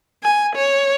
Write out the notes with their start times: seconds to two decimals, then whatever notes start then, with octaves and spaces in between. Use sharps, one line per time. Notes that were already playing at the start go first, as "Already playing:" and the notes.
0.24 G#5
0.56 C#5